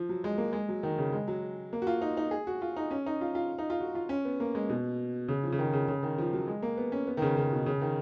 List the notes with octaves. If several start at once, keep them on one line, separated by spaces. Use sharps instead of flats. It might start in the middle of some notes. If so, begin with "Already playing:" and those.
Already playing: F3
F#3
G#3
A#3
G#3
F#3
D#3
C#3
G#3
F#3
A#3
F#4
F4
D#4
D#4
G#4
F#4
F4
D#4
C#4
D#4
F4
F4
D#4
F4
F#4
F4
C#4
B3
A#3
G#3
B2
C#3
F3
C#3
D#3
C#3
C#3
D#3
F3
F#3
G#3
A#3
B3
C#4
B3
D#3
C#3
C#3
B2
C#3
D#3